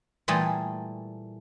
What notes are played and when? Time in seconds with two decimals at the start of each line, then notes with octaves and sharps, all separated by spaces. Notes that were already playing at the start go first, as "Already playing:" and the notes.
0.28 A#2 E3 G3 A3 G#4